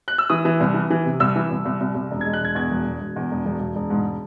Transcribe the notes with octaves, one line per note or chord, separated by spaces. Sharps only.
F#6
E6
E3 D#6
E3
C2
E3
E3
C3
C2 E6
E3
C2
C2
C2
C2
E1
G#3 G#6
F#6
E1 G#6
E2 G#6
E1
E1
E1
E2
E1
E1
E1
E1
G#2